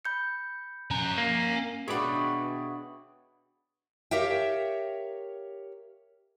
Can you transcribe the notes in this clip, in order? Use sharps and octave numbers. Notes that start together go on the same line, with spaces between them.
B5 G6 C#7
C#4 A#5
A#3
B2 D4 G#4 C#5 E5 F#5 G5 B5
G4 A#4 C#5 E5 F5 G5